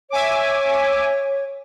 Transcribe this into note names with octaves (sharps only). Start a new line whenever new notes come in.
C#5 E5 G#5 D6